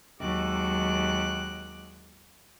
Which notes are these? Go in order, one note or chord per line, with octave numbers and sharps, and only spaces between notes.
D#2 F#3 G#3 D6 F#6